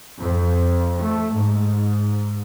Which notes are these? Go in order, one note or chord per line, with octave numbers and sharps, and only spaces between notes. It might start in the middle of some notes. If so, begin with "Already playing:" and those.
F2
A3
G#2